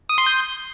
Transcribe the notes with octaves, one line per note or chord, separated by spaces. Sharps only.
D#6
C6
G6